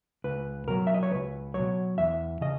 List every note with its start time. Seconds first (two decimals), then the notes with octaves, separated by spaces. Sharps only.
0.24 C#2 B4
0.68 B2 F#3 A#4
0.87 E5
0.94 D#5
1.03 C#5
1.11 C#2 B4
1.54 B2 F#3 C#5
1.98 E2 E5
2.41 C#3 D#5